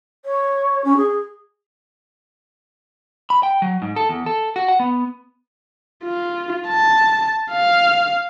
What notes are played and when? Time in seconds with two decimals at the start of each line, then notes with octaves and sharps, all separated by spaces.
0.25 C#5
0.84 C#4
0.97 G#4
3.30 B5
3.43 G5
3.62 F#3
3.82 G#2
3.96 A4
4.09 E2
4.26 A4
4.56 F#4
4.68 F#5
4.80 B3
6.04 F4
6.68 A5
7.51 F5